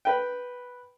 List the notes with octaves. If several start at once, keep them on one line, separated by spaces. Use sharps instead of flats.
B4 G5